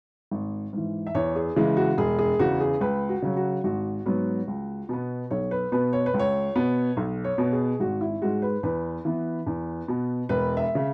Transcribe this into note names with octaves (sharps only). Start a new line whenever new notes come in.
G#1
G#2 E3
E5
E2 C#5
G#4
C#3 E3 G#3
F#4
E1 G#4
G#4
E2 C#3 F#4
G#4
C#2 B4
F#4
C#3 F#3
F#4
G#1 F#4
G#2 F#3 B3
C#2
B2 B3
B1 C#5
B4
B2 B3 B4
C#5
B4
C#2
C#5
B2 B3
B1
C#5
B2 B3
G#4
G#1 F#4
E4
G#2 G#3 F#4
B4
E2 B4
E3 B3
E2
B2 B3
E1 B4
E5
C#3